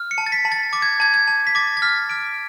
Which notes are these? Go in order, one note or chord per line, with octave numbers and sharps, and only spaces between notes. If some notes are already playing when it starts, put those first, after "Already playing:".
Already playing: F6
C#7
A5
A6
B6
A5
A6
D6 A6
G#6
A5 G#6
G#6
A5
B6
D6 A6
A6
F6 B6
F6 D7